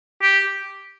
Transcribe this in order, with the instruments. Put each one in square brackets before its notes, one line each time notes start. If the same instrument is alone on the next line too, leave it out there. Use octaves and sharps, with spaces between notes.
[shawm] G4